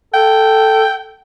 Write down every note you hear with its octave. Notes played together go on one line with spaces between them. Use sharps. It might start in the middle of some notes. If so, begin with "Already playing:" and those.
A4 G5